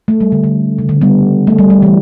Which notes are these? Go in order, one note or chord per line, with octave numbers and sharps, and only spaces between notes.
A3
G3
D3
D3
C#3
D3
G3 B3
A3
G3
G3
E3